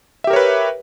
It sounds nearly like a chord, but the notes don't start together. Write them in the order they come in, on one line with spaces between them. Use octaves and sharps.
E5 G4 A#4 C#5 B4